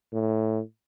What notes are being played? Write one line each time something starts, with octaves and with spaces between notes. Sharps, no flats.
A2